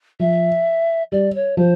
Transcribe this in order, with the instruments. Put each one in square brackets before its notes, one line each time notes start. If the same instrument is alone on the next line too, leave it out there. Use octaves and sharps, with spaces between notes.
[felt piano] F3 [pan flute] E5
[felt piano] G3 [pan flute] D5
[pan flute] C#5
[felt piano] F3 [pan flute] C5